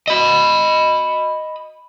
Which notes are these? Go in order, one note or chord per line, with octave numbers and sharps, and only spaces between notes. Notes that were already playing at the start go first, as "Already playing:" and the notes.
D#5 B5